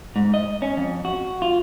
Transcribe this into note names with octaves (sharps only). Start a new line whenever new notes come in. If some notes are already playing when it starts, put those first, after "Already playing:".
G#2
D#5
C#4
F2
F#4
F4